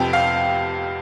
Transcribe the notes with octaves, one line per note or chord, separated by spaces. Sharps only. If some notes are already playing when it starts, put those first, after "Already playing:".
Already playing: F1 F2 C3 G5
F5